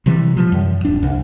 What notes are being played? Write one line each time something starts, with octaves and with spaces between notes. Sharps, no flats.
C3 E3 G3
A#2 F3 G3
F#2
D#1 D4
C2